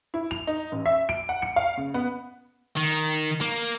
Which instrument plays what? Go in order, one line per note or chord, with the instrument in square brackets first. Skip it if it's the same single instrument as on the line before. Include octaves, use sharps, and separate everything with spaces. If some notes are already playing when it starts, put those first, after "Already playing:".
[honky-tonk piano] E4
F7
D#4
A1
E5
D7
F#5
C#7
F5
C#3
B3
[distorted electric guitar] D#3
A#3